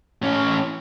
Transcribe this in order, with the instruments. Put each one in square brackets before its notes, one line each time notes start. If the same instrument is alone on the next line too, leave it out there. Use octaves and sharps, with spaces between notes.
[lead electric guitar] A2 C#4